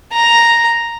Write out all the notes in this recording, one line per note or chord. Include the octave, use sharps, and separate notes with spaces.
A#5